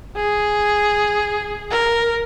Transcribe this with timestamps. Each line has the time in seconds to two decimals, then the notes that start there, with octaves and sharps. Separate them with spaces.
0.16 G#4
1.71 A#4